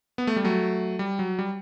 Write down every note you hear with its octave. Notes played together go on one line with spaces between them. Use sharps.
B3
A3
G3
F#3 A3
G3
F#3
G3